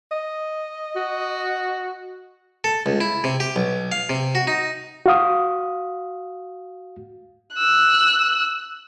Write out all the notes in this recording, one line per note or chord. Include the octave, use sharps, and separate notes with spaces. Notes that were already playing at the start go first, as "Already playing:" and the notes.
D#5
F#4
A4
C#2
E4
C3
G4
B1
F5
C3
F#4
D#4
F#4 F5 D#6
E6 F#6